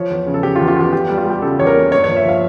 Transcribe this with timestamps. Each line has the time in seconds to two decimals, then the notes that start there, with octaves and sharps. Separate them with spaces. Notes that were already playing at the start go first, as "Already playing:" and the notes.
Already playing: F3 C#5
0.10 E2
0.26 C#3
0.34 A4
0.43 C#3 G4
0.56 F4
0.60 E2
0.68 F4
0.76 E2 G4
0.93 E2 G4
1.09 G3
1.17 F4
1.26 G3 G4
1.42 C#3 A4
1.59 E2 C#5
1.67 A#4
1.76 A#3
1.92 G2 C#5
2.04 F3 C#5
2.17 E5
2.24 F3 F5